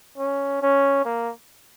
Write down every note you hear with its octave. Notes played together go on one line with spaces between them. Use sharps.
C#4
C#4
A#3